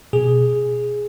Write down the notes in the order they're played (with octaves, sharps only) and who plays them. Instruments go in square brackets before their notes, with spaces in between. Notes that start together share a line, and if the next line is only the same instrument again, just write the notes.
[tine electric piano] B2 G#4